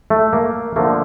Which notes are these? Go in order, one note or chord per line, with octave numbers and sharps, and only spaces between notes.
A3
A#3
D3 F3 A3 A#3